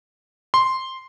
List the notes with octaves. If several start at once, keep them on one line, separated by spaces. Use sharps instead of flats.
C6